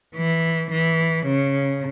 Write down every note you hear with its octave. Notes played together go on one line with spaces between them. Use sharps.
E3
E3
C#3